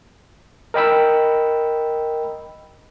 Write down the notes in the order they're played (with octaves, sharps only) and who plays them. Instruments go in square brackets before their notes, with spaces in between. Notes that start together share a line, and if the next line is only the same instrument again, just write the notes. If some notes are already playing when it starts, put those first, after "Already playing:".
[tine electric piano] A#4 D#5 G5 B5 E6